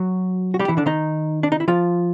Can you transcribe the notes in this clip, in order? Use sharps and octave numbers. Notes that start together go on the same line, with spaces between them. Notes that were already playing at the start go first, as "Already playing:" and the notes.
Already playing: F#3 F#4
F#4
G3 G4
E3 E4
D3 D4
D#3 D#4
D4
D#4
E4
F3 F4